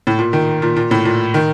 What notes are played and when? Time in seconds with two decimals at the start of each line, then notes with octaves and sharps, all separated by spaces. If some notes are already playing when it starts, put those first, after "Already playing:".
0.07 A2
0.19 A#2
0.33 D#3
0.62 A#2
0.76 A#2
0.91 A2
1.05 A#2
1.34 D#3